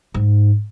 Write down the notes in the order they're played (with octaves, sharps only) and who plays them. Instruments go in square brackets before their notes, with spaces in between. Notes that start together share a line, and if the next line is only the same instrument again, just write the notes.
[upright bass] G#2